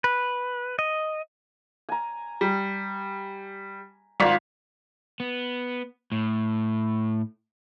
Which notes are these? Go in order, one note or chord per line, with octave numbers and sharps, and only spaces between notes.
B4
D#5
G#5 A#5
G3
G#1 F4 A#4 D5 B6
B3
A2